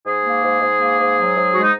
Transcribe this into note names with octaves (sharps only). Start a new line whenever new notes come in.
G#2 G#4
A#3
G#2
G#2
A#3
G#2
F#3
G#2
G#3 F#4
D#4